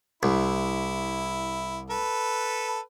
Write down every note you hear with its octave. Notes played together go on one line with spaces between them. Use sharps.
C2 E4
A4 B4